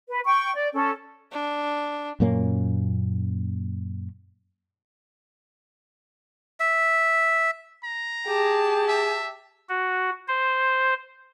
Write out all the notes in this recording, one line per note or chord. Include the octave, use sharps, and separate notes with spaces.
B4
G5 C#6
D5
C#4 A4
D4
F#2 A#2 A#3 C#4
E5
A#5
G4 G#4 A5
E5
F#4
C5